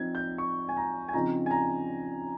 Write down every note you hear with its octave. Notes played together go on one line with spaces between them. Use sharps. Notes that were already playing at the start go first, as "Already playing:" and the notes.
Already playing: F3 C4 D#4 G#6
G6
C#6
G#5
A#5
G#5
C#3 F3 C4 D#4 A#5
G#5
A#5